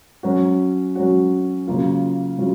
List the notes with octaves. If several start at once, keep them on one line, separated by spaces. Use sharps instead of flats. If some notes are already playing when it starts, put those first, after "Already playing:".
F#3 C#4 F#4
F#3 C#4 F#4
C#3 F#3 A#3 F4
C#3 F#3 F4